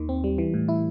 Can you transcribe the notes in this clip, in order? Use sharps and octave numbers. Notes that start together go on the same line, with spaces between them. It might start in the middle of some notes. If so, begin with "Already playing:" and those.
Already playing: D#2 D#3
C4
G3
E3
A2
E4